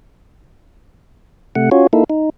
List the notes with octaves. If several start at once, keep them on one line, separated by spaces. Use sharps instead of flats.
C3 A3 F#5
C#4 F4 F#4 C#5
A#3 D#4 E4 A4
D#4